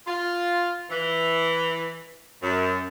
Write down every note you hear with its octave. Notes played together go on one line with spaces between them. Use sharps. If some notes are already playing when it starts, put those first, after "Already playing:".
F4
E3
F#2